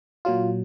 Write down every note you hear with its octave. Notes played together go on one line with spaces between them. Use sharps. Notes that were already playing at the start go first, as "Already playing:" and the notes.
A#2 F#3 F4